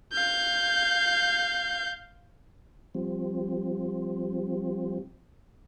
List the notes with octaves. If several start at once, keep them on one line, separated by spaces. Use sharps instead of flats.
F5 G6
F3 G3 C4